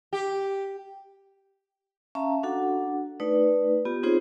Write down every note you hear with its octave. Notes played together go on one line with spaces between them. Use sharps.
G4
C#4 E5 F5 A5 A#5
D4 F#4 A4 F#5
A3 D#4 B4 D5
B3 F4 G4
C4 D#4 F4 G#4 C5 C#5